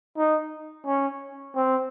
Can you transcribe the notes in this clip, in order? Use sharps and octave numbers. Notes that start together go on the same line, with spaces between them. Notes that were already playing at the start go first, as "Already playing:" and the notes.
D#4
C#4
C4